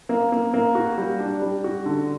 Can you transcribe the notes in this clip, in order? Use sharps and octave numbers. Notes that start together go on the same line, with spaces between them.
A#3
A#3
A#3
F#4
G3
D4
G3
F#4
D3